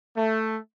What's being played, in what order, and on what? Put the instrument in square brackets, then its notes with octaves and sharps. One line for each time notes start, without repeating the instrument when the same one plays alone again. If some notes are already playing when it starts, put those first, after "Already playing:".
[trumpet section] A3